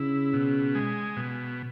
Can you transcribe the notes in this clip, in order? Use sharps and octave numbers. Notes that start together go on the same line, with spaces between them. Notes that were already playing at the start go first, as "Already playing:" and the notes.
Already playing: C#3 E4
B2
G#3
B2